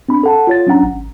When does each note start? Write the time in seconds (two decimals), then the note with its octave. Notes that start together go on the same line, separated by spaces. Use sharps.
0.09 C4 D4 B5
0.23 A4 F#5 A5
0.47 F4 C#5 A6
0.67 F#3 C#4 D4 F#5 A#5
0.83 G#1